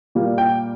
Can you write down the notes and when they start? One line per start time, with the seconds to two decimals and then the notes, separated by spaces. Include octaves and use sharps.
0.15 A#2 G3 A#3
0.38 G5